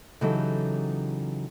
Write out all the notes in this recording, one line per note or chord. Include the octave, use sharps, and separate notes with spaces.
C#3 E3 F#3 D#4 G4 A4